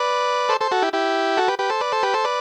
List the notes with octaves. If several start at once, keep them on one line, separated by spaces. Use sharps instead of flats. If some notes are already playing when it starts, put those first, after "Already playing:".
Already playing: B4 D5
A4 C5
A4 C5
F#4 A4
E4 G4
E4 G4
F#4 A4
G4 B4
G4 B4
A4 C5
B4 D5
A4 C5
G4 B4
A4 C5
B4 D5